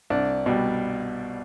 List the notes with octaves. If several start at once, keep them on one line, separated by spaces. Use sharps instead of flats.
C2 D4
B2 G3